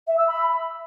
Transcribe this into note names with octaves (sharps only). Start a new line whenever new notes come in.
E5
E6
B5